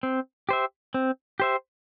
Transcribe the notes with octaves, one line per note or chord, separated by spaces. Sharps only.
C4
G4 C5 E5
C4
G4 C5 E5